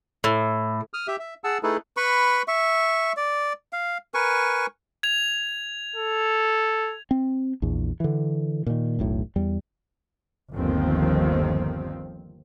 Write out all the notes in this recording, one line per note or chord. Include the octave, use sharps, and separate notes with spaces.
A2
D#6 F6
G4 E5
E5
G#4 F#5 A5 E6
A3 D#4 E4 G#4 A4 B4
B4 B5 C#6
E5 C#6
D5
F5
A#4 B4 G#5 C#6
G#6 F7
A4
C4
A#1 E2
D3 E3
A#2 D#3
E1 B1 A2
E2 G3
G1 D#2 D#3 F3 C4